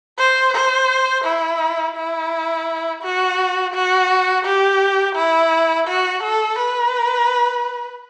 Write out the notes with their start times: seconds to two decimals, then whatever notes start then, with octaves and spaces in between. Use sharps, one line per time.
0.18 C5
0.53 C5
1.24 E4
1.96 E4
3.02 F#4
3.74 F#4
4.45 G4
5.16 E4
5.87 F#4
6.23 A4
6.59 B4